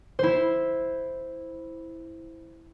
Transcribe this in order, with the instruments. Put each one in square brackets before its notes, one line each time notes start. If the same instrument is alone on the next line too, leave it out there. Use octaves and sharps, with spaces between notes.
[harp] E4 C5